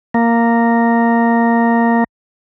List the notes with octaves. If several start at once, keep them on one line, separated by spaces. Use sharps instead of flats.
A#3